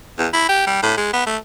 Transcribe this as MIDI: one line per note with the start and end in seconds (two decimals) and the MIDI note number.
0.18 0.28 40
0.33 0.46 64
0.49 0.62 67
0.67 0.78 55
0.83 0.92 45
0.98 1.10 56
1.13 1.27 59
1.27 1.37 57